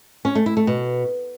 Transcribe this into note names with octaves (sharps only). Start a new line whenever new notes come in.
C#4
A3
E4
A3
B2